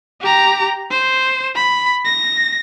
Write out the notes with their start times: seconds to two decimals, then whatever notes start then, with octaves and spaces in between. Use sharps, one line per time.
0.21 G4 A#5
0.90 C5
1.56 B5
2.05 A#6